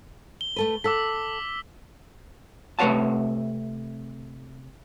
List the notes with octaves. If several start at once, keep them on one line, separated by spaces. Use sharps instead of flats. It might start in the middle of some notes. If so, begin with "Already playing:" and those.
G7
A3 A4 B4
A4 F#5 D6 E6 B6
C3 A3 B4 C#5 F#5 A5